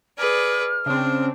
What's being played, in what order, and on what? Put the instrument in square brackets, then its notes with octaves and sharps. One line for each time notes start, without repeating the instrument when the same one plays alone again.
[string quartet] G#4 B4 D5 [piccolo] F6
[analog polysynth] C#3 C4 [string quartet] D4